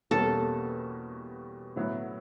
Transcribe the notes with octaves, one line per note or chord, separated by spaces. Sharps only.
E2 B2 G3 A#3 C#4 A4
A2 F#3 B3 E4